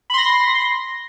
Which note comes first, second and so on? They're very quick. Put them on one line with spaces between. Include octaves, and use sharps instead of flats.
B5 C6 A#6